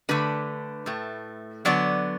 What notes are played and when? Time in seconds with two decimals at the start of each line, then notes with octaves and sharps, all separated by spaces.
0.09 D3 A3 B4
0.86 A2 A3
1.65 D3 F#3 B3 D5